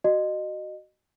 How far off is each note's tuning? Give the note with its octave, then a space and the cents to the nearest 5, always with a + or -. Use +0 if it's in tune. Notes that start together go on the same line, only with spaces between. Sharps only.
F#4 +15 D#5 -25